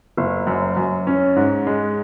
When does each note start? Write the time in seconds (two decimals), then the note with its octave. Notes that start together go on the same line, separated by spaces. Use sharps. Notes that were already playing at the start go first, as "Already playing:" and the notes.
0.17 F#1
0.47 F#2
0.77 F#2
1.07 C#4
1.36 G#2
1.67 G#3